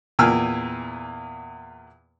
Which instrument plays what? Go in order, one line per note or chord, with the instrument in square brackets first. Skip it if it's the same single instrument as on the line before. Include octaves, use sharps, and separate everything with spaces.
[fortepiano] E2 A#2 G5 G#5 E6 F6